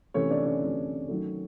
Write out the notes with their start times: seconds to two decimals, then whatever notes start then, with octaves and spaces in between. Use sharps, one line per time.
0.14 C3 E3 A3 C#4 C#5
0.31 D4 D5
0.46 C#4 C#5
0.62 C3 E3 A3
1.09 D#3 F#3 A3